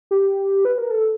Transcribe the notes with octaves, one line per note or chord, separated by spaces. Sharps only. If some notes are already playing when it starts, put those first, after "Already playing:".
G4
B4
A#4
A4